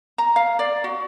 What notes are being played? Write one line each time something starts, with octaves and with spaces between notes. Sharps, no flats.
A#5
F5
D5
F#4